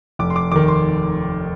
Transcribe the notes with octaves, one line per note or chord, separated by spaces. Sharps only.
F1 D6
C6
D6
D#2 D#3 D6
C6